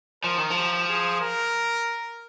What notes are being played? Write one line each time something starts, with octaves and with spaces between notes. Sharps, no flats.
F3 A#4
D#3
F3
G4
G#4
A#4